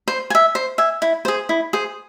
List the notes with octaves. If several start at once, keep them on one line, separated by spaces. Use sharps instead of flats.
C5
G#5
E5
C5
E5 G#5
E4
G#4 C5
E4
G#4 C5